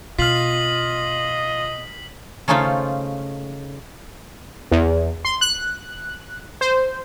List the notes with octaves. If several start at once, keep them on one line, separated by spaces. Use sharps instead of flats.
B2 F4 D#5 F6 B6 C7 F#7
C#3 A3 C#4 D#4 F4 C5
E2
C6
F#6
C5